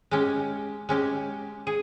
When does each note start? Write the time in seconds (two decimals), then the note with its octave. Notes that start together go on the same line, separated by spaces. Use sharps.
0.11 G#3 C#4 G4
0.89 G#3 C#4 G4
1.67 G#4